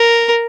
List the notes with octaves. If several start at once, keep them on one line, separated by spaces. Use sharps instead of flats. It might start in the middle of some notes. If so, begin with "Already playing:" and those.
Already playing: A#4